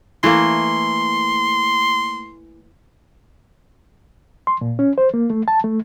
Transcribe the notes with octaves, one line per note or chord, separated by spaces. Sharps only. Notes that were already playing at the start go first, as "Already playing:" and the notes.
E3 A3 A#3 C6
C6
A#2
C#4
C5
A#3
A3
A5
A3